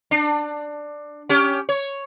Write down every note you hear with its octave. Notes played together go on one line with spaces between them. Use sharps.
D4
C#4 G4
C#5